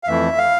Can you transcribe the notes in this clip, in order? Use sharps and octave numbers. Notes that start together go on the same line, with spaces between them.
F5
F2 E3 A3 E4 E5
F5